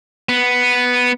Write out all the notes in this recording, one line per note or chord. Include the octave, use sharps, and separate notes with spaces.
B3